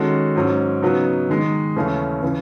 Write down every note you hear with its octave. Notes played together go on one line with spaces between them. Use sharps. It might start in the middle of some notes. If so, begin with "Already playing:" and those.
Already playing: D#3 G#3 C#4 F#4 A4
G#2 F#3 C#4
C#3 F#3 B3 D#4
D#3 G#3 D#4
D#2 C#3 E3 A3 C#4
C#3 E3